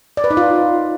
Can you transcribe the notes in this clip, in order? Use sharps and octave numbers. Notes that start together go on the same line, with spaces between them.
D5
B4
D#4
F4